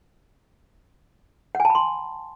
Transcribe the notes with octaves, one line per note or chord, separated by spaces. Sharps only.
F#5
G#5
A5
B5
C6